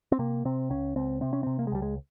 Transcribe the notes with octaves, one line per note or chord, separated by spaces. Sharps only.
C4
C3 A#3
C3 C4
C#2 C#4
C#2 C4
C3 C4
C#4
C3 C4
A#3
G#3
C#2 G3
G#3